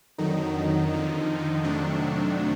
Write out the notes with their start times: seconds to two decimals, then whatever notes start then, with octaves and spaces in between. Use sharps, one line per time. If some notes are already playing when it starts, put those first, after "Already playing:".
0.18 F2 D3 D#3 F#3 D#4
0.92 F2 D3 F3
1.64 F2 C3 D#3 F#3 A3 D4